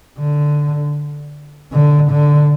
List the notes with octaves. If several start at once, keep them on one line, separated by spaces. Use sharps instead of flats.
D3
D3
D3